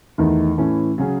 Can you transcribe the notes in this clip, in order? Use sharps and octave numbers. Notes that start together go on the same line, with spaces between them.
E2 D#3 A3 D#4
A2 E3 A3 C#4
C#3 F#3 C#4 G#4